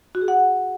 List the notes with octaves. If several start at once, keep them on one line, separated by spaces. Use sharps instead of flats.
F#4
G#4
F#5